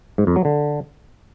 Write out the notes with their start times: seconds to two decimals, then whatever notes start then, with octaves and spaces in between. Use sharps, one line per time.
0.18 G#2
0.27 F2
0.36 F#3
0.45 D3